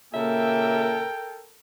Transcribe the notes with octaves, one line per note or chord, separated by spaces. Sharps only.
A#2 C#3 A#3 A4 A#4 E5 G5